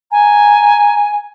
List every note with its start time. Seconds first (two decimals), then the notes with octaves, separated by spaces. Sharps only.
0.12 G#5 A#5